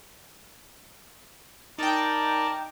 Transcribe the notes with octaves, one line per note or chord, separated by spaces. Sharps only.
D#4 A#4 D5 G5 A5